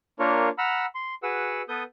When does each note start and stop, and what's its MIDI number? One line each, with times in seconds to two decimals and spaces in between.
0.19 0.49 58
0.19 0.49 62
0.19 0.49 65
0.19 0.49 70
0.19 0.49 73
0.58 0.86 78
0.58 0.86 82
0.58 0.86 83
0.58 0.86 88
0.58 0.86 89
0.95 1.14 84
1.23 1.62 66
1.23 1.62 68
1.23 1.62 71
1.23 1.62 78
1.23 1.62 88
1.69 1.83 59
1.69 1.83 69
1.69 1.83 71
1.69 1.83 87
1.69 1.83 91